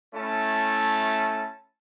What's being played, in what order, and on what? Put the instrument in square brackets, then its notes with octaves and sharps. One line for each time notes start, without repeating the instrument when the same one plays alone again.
[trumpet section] A3 C#4 E4 A5